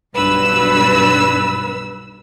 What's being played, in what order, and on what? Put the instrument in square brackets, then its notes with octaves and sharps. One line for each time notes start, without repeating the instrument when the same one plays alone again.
[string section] B1 G2 E6 [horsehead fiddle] B4